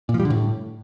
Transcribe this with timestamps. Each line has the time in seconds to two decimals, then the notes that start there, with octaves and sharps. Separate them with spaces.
0.09 A#2
0.14 F3
0.20 G3
0.25 D3
0.30 A2